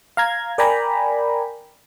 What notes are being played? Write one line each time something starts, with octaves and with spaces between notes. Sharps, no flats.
F5 A#5 G#6
A#4 D5 G5 G#5 A#5 B5